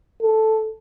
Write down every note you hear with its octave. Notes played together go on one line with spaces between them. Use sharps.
A4